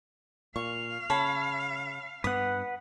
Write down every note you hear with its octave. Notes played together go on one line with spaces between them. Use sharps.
A#2 F5 C#6
C#3 C#5 A5 B5
G2 B3 B4 F#5 D#6